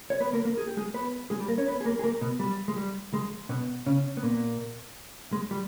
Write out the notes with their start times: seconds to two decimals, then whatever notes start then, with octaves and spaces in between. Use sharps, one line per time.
0.10 C#5
0.20 B3 B4
0.33 A#3 A#4
0.45 A#3 A#4
0.58 G#4
0.67 G4
0.77 G#3 G#4
0.94 B3 B4
1.30 G#3 G#4
1.40 G3 G4
1.48 A#3 A#4
1.58 C#4 C#5
1.66 B3 B4
1.81 G#4
1.85 A#3 A#4
1.99 G#4
2.04 A#3 A#4
2.21 B2 B3
2.39 G3
2.68 G#3
2.76 G3
3.14 G#3
3.49 B2 B3
3.86 C#3 C#4
4.17 B3
4.23 A#2 A#3
5.33 G#3
5.51 G3